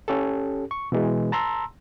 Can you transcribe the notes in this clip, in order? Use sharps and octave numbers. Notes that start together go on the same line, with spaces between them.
C#4 G4 A4
C#6
B2 E3 G#3
A5 A#5 C6 E6